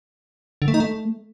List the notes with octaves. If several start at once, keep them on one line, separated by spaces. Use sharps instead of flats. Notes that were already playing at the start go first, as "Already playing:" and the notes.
D3
A3
D#4
A3